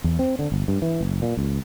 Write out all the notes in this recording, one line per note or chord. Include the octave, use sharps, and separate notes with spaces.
E2
C4
D3
G1
G2
E3
F#1
A#2
C#2